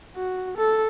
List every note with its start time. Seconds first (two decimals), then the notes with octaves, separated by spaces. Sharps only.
0.16 F#4
0.57 A4